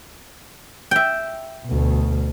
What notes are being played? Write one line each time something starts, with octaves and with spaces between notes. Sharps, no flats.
E5 G5
D2 B2